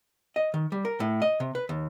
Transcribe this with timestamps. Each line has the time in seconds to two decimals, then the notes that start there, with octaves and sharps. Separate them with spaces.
0.36 D#5
0.54 D#3
0.72 G3
0.85 A#4
1.00 A2
1.22 D#5
1.40 C3
1.55 B4
1.69 D#2